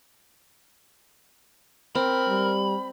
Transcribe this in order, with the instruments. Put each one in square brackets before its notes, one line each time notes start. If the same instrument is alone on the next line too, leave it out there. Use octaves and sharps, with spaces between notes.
[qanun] C4 [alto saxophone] A#4 [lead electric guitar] B5
[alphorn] G3